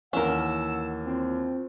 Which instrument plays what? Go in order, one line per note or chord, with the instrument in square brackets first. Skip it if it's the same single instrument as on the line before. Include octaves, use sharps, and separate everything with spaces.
[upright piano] D#2 E3 [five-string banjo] C#4 A#4 [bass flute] F#5 [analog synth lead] E6
[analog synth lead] C4 [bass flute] F4